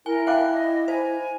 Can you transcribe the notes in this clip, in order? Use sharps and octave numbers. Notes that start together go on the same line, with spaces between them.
E4 A#4 G#5
E5 F5 G5 A5 D6 F#6
D#5
C5 G#5